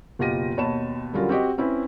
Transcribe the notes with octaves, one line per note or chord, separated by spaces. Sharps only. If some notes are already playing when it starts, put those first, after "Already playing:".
F#1 B2 F4 G4 A#6 D#7
D#2 B2 C#5 A5 B5 E7
D3 F#3 G3 C#4 F4 A#4
C4 F#4 G4 D#5
C4 C#4 E4 B4